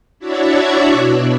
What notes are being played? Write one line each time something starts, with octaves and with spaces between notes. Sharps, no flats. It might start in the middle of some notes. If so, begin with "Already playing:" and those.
D4 E4 F#4 C#5 D5 E5
B2